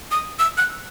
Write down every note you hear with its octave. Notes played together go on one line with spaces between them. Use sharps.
D#6
E6
F#6